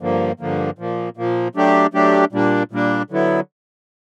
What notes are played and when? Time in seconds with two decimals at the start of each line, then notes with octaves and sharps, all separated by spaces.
0.01 G2 D3 F3 A#3
0.40 G2 D3 F3 A#3
0.78 A#2 F3 A#3
1.17 A#2 F3 A#3
1.55 F#3 A3 D4 G4
1.93 F#3 A3 D4 G4
2.32 A#2 G3 A#3 D4
2.71 A#2 G3 A#3 D4
3.10 D3 F#3 B3 E4